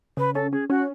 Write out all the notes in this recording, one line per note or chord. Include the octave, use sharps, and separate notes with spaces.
C#3 B4
C#4 A4
C#4 G#4
C#4 F#4